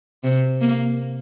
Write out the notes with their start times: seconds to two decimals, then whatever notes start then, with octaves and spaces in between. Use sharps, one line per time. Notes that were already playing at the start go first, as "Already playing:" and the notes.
0.24 C3
0.61 A#3